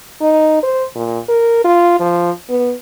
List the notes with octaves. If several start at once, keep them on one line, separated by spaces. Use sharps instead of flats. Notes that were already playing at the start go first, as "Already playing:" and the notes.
D#4
C5
A#2
A#4
F4
F3
B3